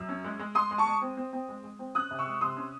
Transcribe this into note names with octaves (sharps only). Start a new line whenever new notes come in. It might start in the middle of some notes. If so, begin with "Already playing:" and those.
Already playing: F#2 E6
C#4
G#3
G#3
G#3 C6 D#6
G#3
A5 C#6
G#3
C4
C4
C4
G#3
G#3
C4
C#4 D#6 F#6
C3
C#6 E6
G#3
C3 C6 D#6
C#4